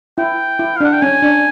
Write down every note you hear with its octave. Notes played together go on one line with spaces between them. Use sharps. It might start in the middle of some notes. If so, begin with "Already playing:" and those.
E4 G5
E4
F5
D4
F#5
G5
C#4 G#5
D4